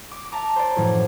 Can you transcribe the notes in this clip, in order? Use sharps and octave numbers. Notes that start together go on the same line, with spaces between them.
D6
E5 A5 A#5 D6
C5 D5
F#2 A2 E3 F3